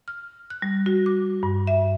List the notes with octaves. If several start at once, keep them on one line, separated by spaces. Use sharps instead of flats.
F6
F#6
G3
F#4
D6
G2
E5